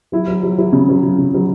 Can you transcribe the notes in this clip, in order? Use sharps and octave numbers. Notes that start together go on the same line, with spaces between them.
F#3 E4
F#3
F#3
F#3 E4
C#3
F#3
F#3
C#3
F#3